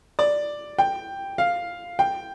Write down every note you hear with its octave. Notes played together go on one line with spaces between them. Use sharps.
D5
G5
F5
G5